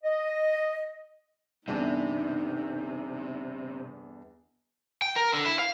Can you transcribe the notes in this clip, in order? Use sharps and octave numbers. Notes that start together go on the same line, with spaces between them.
D#5
G1 E2 C3 D4 D#4
G5
A#4
D3
E4
F5